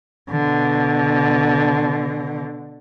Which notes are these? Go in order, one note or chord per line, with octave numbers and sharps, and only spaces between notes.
B2 D3